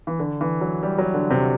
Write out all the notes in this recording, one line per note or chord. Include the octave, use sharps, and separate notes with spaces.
E3
D3
E3
F#3
G3
F#3
D3
C3